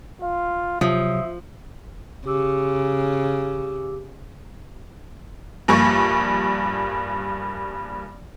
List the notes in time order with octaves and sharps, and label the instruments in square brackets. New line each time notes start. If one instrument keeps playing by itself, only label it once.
[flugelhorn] F4 [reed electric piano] F5
[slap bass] C3 F#3 [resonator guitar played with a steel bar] F3 [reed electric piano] F4 D#6 [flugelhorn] E5
[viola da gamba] C#3 [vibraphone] G4 D6 E6
[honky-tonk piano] A#1 G2 A#3 C#6